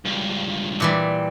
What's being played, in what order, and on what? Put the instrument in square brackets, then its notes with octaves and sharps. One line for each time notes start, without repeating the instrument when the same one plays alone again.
[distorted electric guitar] C#2 G2
[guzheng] A#2 E3 G3